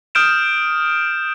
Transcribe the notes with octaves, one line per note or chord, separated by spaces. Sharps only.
D#6 F6 G6 D7 E7